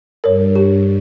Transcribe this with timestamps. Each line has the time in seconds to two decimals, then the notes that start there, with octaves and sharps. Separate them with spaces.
0.24 G2 A#4 C#5
0.56 G4